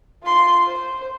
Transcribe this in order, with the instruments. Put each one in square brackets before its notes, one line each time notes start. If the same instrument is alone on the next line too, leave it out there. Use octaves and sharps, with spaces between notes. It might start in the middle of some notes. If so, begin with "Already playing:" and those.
[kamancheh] F4 C6
C5